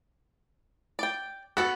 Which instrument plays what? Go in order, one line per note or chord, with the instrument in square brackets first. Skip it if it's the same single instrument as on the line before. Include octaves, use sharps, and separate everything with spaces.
[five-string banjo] D5 G5
[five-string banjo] B3 A4 F#5 [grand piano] F#4